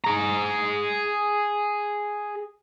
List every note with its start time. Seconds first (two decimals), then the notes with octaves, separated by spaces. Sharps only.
0.04 G#4 A#5